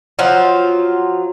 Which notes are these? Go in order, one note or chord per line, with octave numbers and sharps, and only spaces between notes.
F3 F#3 F4